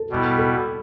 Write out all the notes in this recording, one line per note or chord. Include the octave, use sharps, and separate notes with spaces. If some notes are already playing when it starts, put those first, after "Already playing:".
Already playing: A4
B2 G3 B3 E4
A4